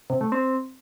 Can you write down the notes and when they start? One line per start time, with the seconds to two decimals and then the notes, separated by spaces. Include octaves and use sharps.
0.10 C3
0.21 A3
0.32 C4